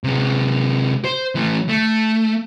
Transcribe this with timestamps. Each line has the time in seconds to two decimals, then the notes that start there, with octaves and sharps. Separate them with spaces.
0.04 C3 G#3
1.05 C5
1.35 E3 A3
1.69 A3